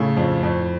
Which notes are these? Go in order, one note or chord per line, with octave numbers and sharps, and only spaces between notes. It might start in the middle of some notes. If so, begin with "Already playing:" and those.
Already playing: A2 C#3 A3
F2
F2